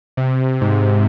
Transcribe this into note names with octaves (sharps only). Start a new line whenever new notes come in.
C3
G#2